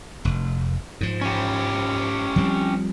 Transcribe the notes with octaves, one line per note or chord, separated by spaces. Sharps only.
F1
G#2 F3
C#4 G4
F3 G3 C4